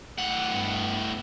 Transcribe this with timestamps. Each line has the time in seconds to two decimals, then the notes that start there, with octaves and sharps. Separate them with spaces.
0.19 A2 F#5
0.50 G2 B3